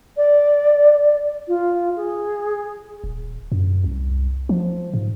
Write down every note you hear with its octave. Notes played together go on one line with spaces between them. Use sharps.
D5
F4
G#4
D#1
F#2
C2
F3
G#2